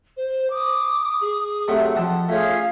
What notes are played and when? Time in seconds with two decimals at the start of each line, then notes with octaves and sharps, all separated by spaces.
0.17 C5
0.50 D6 D#6
1.21 G#4
1.68 C3 F#3 A3
1.95 F2 F#5 A5
2.29 A3 C#4 F4 G#4 F5 G#6